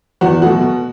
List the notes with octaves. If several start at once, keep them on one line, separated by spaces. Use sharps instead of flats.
E2 F#4 F#5
B2 F#3 A3 F#4 F#5
B2